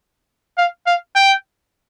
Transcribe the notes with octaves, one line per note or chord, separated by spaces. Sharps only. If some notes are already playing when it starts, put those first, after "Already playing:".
F5
F5
G5